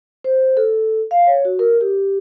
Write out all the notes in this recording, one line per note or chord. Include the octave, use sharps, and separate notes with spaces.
C5
A4
F5
C#5
F#4
A#4
G4